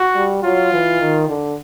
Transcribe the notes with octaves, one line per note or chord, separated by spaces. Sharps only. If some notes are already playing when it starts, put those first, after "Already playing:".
Already playing: F#4
G3
F#3 F4
E3
D#3
D3